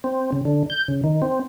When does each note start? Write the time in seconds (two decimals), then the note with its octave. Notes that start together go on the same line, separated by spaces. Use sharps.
0.04 C4
0.32 C#3
0.45 D3
0.70 G6
0.88 C#3
1.04 D#3
1.22 C4